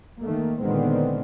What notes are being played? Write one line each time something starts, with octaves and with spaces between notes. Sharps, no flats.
D#3 A3 A#3
A#2 D3 D#3 G#3 B3 C4